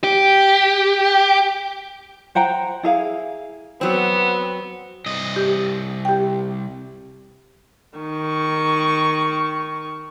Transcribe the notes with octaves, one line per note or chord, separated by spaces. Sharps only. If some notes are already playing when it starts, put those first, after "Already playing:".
G4
C5 F#5 G5 A#5
E4 G#4 F5
F#3 B3 C4
C2 D#5
G4
G4 G5
D#3 C#6